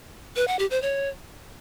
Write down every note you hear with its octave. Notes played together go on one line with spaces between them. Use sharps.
B4
F#5
G4
C5
C#5